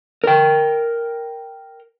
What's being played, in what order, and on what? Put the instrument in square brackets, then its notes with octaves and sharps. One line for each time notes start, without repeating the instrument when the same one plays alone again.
[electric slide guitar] A#4 G5